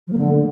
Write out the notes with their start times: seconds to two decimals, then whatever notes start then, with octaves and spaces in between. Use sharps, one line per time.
0.07 F3
0.12 A#3
0.17 D3